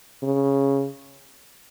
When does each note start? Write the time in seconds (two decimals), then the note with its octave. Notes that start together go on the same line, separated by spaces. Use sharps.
0.23 C#3